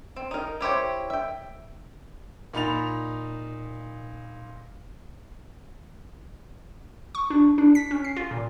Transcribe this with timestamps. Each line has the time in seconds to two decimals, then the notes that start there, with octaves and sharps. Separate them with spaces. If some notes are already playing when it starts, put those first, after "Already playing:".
0.16 C4
0.31 D#4 A#4
0.61 E4 G4 C5 C#5
1.10 E5 G5
2.54 A#2 D#4 B5 A6 F7
7.15 C#6
7.30 D4
7.58 D4
7.75 B6
7.91 C#4
8.04 C7
8.16 F4
8.31 A#2